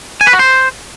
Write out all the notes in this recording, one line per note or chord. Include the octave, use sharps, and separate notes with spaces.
G#5
B4
F#4
C5